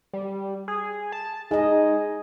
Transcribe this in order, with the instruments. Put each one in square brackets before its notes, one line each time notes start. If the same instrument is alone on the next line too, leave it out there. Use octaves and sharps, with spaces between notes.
[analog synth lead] G3
G#4
A5
[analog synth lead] G#3 [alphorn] D#4 [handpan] G#4 D#5